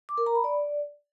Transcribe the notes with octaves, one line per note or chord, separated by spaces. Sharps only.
D6
A#4
A#5
B5
D5